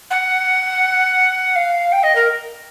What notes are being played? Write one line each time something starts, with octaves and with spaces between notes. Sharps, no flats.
F#5
F5
G5
D#5
A#4